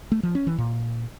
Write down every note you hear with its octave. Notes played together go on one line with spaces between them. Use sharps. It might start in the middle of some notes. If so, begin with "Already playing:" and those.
A3
F3
C#4
E3
A#2